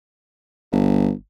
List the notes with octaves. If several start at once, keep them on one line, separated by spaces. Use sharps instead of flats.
G1